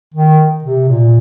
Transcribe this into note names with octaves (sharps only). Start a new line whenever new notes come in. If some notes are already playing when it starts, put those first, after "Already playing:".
D#3
C3
A#2